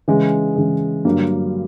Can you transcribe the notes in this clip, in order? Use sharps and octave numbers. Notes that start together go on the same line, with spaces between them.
C#3 E3 G#3
C#3 E3 G#3
G2 D3 F#3 A#3